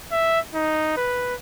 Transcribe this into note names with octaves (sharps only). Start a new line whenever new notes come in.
E5
D#4
B4